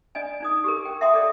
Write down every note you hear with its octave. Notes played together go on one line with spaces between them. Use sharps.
D4 D5 D#5 G#5
D4 D#4 D#6
G4 G#4 A#4
G5
E5 F#5 G5 A5 C6 D#6
A4 D5 D#5